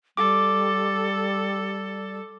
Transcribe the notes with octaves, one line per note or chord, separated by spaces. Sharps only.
G3 A4 D6